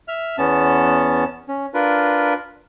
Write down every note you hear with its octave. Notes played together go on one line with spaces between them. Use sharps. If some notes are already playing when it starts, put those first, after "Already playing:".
E5 F6
E2 B3 C#4 A5
C#4
D4 F4 A#4 B4